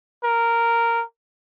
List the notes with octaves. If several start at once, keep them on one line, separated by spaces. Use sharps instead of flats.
A#4